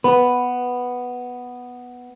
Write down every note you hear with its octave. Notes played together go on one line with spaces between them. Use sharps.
B3 B4